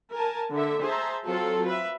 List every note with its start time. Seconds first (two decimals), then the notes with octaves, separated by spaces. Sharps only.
0.13 A#4 G#5 A5
0.52 D3 E5
0.83 G#4 C5 E5 A5 A#5
1.25 F#3 C4 F4 A4
1.66 B4 E5